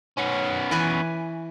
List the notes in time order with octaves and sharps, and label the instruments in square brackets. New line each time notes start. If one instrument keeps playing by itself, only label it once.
[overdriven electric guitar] B3 C#4
[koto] E3 B4 G#5